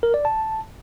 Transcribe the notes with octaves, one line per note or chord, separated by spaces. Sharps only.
A#4
D5
A5